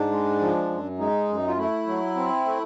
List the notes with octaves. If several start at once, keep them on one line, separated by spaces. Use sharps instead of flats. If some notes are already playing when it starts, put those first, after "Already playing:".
Already playing: G#2 D4
G#3
F3
F#2
G#3 D#4
F#2
F4
A3 E4
F#3
C4
A3